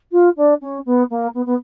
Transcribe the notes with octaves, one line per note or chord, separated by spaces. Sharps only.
F4
D4
C#4
B3
A#3
B3
B3